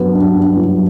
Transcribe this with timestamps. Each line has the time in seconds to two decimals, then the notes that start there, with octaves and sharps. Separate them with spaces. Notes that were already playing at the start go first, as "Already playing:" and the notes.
Already playing: G2 F#3 B3
0.13 D4
0.35 G2
0.57 F#3